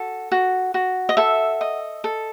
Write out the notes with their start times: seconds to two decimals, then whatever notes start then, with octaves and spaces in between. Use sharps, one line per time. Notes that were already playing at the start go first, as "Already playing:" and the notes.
Already playing: F#4 A4
0.32 F#4
0.74 F#4
1.09 D#5
1.17 A4 E5
1.61 D#5
2.04 A4